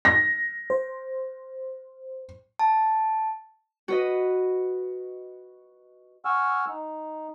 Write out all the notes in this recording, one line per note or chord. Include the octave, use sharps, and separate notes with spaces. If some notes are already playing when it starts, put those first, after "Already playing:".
A#6
C5
A5
F#4 B4 D#5
F#5 G#5 C#6 E6 F6
D#4